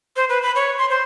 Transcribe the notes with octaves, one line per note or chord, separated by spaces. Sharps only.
C5
B4
B5
C#5
C6
C5